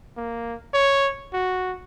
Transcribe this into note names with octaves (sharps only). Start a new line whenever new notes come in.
A#3
C#5
F#4